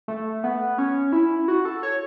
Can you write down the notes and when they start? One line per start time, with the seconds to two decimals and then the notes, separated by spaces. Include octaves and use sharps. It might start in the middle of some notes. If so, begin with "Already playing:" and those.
0.08 A3
0.44 B3
0.78 C#4
1.12 E4
1.48 F#4
1.65 A4
1.83 C#5